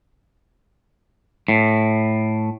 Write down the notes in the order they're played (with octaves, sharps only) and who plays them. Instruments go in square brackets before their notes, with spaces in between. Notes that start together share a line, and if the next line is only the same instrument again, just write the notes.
[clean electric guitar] A2